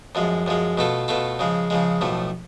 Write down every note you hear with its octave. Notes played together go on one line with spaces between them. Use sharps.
F#2 F3 G#3
F#2 F3 G#3
B2 A3 F4 A4
B2 A3 F4 A4
C#3 F3 G#3
C#3 F3 G#3
B1 A2 F3 A3